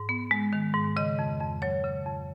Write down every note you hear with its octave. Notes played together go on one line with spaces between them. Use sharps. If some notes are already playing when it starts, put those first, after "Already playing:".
Already playing: G#2
B3
G#3
D#3
G#2
C#3 D#5
F2
F2
F#3 C#5
C#3
F2